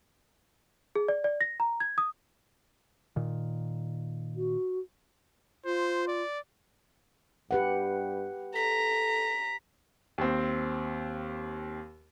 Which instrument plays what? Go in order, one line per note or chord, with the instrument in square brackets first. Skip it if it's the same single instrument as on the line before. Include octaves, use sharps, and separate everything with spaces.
[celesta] G#4
D5
D5
A#6
A#5
G#6
D#6
[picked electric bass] A#2 D#3
[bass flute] F#4
[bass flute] F4 [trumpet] C5
[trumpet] D5
[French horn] G2 [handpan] G4 B4 F#5
[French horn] A4 [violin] A#5 [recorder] B6
[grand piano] D#2 C4